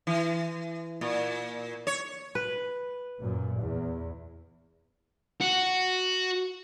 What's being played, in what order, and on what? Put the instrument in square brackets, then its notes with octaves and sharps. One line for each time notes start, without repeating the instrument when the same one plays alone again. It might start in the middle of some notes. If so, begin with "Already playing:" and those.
[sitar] E3
A#2
C#5
[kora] B4
[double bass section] F#2 A#2
E2
[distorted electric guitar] F#4